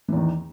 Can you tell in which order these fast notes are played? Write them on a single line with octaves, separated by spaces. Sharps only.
E3 E2 D#3